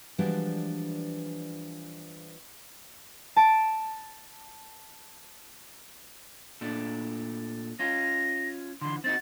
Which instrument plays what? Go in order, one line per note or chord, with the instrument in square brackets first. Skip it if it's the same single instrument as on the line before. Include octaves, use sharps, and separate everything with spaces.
[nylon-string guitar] E3 F3 G3 G#3 D4 F#4
[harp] A5 D7
[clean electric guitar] A#2 A3 D4
[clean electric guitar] C#4 F4 [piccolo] A#6
[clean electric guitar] D3 E3 [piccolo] C6
[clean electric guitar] C4 D#4 F#4 [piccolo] A6